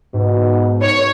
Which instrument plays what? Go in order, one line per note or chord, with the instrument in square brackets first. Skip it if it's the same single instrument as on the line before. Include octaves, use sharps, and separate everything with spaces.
[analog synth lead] G#2 [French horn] B2
[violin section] C#5